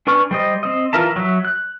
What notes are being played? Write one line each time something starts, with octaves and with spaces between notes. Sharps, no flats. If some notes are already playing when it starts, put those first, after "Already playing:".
D4 B4 G#5 C#6 F6
G3 C5 D#5
C4 D#5
E3 F4 A#4 E5 A5
F#3 E5
F#6